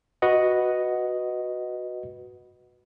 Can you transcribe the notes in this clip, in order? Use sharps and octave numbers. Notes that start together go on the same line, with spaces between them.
F#4 B4 D#5 F#5